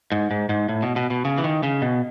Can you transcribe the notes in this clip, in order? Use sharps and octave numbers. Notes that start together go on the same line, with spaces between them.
G#2
G#2
G#2
A2
B2
B2
B2
C#3
E3
D#3
C#3
B2